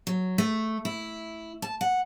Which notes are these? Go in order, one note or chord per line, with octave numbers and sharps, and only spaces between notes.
F#3
A3
E4
A5
F#5